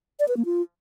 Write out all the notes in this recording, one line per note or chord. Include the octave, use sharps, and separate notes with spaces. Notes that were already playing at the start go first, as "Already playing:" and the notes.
D5
B4
A#3
F4